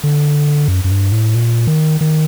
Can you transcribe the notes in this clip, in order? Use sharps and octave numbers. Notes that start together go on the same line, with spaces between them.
D3
F#2
F#2
G2
A2
A#2
D#3
D#3